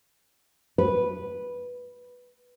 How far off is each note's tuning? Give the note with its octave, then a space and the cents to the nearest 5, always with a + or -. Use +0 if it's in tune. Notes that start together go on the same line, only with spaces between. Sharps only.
B4 -5